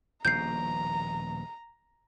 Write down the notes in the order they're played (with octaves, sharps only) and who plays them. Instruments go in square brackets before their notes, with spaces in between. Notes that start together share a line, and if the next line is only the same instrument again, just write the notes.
[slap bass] D#1 A#1 B2 [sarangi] A#5 [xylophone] G6 C7